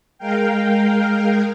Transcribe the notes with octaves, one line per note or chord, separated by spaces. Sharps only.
G#3 A#4 F5 G5